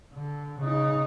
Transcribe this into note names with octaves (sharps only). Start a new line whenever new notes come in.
D3
C#3 D#4